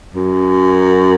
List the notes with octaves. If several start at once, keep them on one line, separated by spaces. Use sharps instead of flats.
F#2